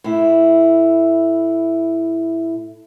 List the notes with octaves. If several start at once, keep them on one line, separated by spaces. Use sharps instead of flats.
A2 E4